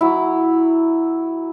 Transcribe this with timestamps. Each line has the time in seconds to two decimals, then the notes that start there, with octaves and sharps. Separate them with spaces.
0.01 F#3 E4